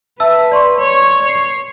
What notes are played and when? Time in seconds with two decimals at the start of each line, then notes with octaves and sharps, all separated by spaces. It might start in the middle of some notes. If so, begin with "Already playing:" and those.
0.20 B4 E5 A5 E6
0.52 D5 C6 C#6
0.80 C#5
1.29 C7